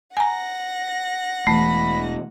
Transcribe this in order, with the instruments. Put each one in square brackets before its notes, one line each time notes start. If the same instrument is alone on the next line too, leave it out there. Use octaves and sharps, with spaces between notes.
[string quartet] F#5 A#6 [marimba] G#5 A#5
[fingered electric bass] E1 E3 [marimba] A3 [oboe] B5